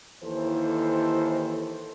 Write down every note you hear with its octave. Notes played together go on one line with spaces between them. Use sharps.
D#2 E3 E4 A4 C5